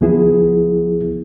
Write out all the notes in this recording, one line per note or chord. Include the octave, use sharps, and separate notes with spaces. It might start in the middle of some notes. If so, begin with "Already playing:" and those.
C#2 F3 B3 E4 G#4